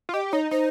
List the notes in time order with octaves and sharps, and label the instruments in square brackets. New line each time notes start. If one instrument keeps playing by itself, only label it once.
[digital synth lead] F4
[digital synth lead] G4 [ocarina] D#5
[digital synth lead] D#4 [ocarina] C#5
[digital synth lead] D#4 [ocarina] C5